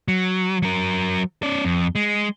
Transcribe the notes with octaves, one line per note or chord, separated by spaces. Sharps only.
F#3
F#3 A#4
C#4 D5
F2
G#3